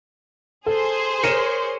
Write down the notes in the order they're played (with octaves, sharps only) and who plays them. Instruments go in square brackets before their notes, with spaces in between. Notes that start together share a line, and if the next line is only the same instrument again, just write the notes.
[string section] G#4 C5 [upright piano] A4
[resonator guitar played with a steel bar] A#4 C#5 [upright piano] C#7 D#7 E7